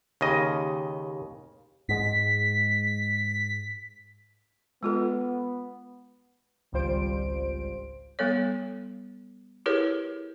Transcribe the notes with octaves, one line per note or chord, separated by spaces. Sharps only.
D#2 C#3 D#5
G#2 G#3 B6
G#3 B3 F4 A4
G#1 C#2 G3 F4 C5 D7
G3 B3 A4 C#5
E4 G4 G#4 A#4 B4 C#5